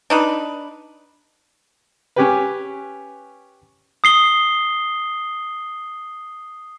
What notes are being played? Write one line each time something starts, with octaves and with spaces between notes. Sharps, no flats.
D4 D#4 B4
C#4 G4 B4
D#6 C7 G7